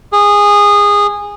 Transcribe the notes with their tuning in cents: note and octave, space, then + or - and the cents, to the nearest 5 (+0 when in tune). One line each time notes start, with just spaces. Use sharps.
G#4 -20